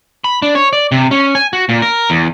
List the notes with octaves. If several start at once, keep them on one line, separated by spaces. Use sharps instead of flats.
B5
D4
C#5
D5
C3
C#4
G#5
F#4
A#2
A#4
E2